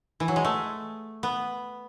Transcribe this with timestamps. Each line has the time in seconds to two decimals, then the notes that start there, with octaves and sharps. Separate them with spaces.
0.20 E3
0.28 F#3
0.36 G#3
0.45 A3
1.23 B3